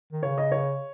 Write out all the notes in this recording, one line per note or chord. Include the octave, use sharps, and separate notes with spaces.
D#3
C#3 C#5
D#5
C#5